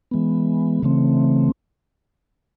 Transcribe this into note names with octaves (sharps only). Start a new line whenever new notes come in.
E3 G#3 B3
C#3 E3 A3 C4